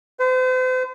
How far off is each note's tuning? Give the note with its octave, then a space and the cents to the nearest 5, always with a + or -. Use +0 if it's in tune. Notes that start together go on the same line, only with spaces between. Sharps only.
C5 -40